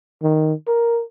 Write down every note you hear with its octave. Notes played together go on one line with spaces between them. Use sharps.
D#3
A#4